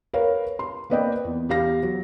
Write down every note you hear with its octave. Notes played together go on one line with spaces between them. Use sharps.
A#4 B4 C#5 F5
C6
A#3 C4 B4 D5 D#5 G5
E2
E2 G4 F5 A#6
F#3